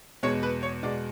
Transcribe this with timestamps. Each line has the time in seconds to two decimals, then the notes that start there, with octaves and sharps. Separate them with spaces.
0.23 E2 B2 G#3 C#5
0.43 B4
0.63 C#5
0.83 E2 B2 G#3 D5